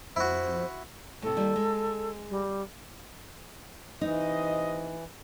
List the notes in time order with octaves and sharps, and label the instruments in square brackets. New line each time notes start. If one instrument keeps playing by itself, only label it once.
[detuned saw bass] F2 [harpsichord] E4 F#4 [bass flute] C5
[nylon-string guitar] A2 C3 [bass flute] A4
[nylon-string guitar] D#2 G3
G#3
[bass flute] G3
[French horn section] C3 C5 D#5 [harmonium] E3 [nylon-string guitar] D#4